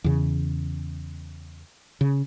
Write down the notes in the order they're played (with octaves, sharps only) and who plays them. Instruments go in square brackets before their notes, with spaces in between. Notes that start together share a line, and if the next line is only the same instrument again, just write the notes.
[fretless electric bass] E2 C#3
C#3